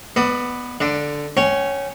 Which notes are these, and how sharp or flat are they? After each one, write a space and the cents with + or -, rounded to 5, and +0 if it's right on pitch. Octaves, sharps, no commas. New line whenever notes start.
B3 +0 D5 +30 D#6 +35
D3 +0 D5 +15
C#4 +0 C#5 +0 G5 -35